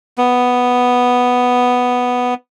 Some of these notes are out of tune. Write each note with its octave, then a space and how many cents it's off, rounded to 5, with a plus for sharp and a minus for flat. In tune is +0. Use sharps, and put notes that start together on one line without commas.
B3 +0